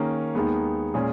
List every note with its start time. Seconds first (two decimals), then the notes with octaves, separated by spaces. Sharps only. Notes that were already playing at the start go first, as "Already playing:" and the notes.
Already playing: D#3 A#3 C#4 G#4
0.35 D#2 D#3 G#3 B3
0.94 A#2 G#3 C#4 G#4